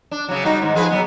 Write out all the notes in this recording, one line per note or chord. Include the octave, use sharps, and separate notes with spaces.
D4
C#3 F#3
G3 D#4 F#4
G#2 D#3
F3 G#4 B4
F#3 G3 B3